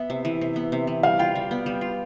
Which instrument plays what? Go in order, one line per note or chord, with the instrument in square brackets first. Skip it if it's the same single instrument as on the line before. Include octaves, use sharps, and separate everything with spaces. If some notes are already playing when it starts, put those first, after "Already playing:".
Already playing: [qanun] B3 [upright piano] E5
[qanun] C3
E3
C3
B3
C3
E3
[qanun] G3 [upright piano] F5
[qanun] F4 [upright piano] G5
[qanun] G3
B3
G3
F4